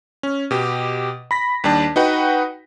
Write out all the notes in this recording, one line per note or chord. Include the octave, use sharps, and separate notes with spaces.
C#4
B2 G4
B5 A#6 B6
D#2 G3 D4 A5
D#4 F#4 B4 F#5 G5